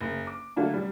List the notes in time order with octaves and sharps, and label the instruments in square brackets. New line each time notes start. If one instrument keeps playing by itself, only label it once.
[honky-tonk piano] F#1
D6
D3 F#3 A3 A#3 D4
F#2 G3